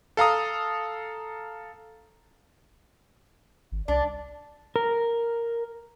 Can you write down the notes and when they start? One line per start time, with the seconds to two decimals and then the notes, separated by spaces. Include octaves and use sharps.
0.17 A4 F5 A#5 D#6
3.72 G#1
3.88 C2 D4 D5
4.76 A#4